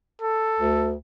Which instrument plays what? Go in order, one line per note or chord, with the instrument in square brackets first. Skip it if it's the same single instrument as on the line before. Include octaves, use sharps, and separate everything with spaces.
[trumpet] A4
[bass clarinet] D2